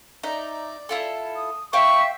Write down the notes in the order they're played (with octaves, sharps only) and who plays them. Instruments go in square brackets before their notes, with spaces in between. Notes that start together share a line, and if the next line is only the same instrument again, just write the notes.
[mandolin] D#4 E5 [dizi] D5
[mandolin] E4 F4 A4
[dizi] D#6
[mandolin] C5 F5 G5 [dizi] E5 [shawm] C#6